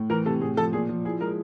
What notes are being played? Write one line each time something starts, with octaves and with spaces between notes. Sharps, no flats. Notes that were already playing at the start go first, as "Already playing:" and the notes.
Already playing: A2
E3 A#4
C3 A4
A2 G#4
F3 A4
A#2 G#4
F3
E4 G#4
G#3 A#4